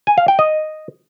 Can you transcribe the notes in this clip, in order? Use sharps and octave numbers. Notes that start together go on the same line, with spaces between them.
G#5
F5
G5
D#5